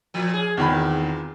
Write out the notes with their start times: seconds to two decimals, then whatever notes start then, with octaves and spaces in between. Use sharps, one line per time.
0.14 A#2 F3
0.34 G#4
0.57 E2 A#2 D#3 C4 B5